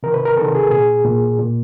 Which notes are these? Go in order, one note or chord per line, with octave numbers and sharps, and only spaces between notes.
C3 D#3 A#4
B4
A#4
C3 D#3 A4
G#4
A#2 G#4
A#2
A#2